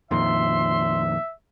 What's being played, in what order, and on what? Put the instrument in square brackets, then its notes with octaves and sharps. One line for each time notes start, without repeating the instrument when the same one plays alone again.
[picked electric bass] F2 A#2 D#3 [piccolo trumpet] E5 [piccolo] C6